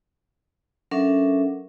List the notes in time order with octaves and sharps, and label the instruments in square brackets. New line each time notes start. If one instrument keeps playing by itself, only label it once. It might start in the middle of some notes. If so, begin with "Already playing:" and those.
[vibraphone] F#3 C#4 D4 A4 A#4 E5